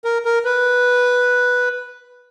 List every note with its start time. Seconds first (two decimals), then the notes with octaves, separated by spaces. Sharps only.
0.05 A#4
0.25 A#4
0.44 B4